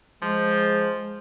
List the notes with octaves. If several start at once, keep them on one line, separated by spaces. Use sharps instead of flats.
F3 G#3